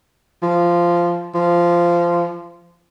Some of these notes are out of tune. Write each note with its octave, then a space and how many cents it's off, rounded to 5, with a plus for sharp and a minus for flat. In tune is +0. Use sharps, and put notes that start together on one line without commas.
F3 -10
F3 -15